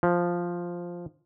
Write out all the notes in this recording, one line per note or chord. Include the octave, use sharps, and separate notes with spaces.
F3